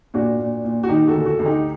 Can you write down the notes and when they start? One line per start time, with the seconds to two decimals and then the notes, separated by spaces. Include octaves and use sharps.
0.14 A#2 D4 F#4
0.39 A#2
0.65 A#2
0.84 F#4
0.89 D#3 D#4 G4
1.08 F#4 A4
1.14 D2
1.26 F#4 A4
1.39 D2
1.45 D#4 G4